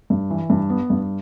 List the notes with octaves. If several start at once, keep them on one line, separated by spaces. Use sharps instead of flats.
G2
E3
G2
B3
G2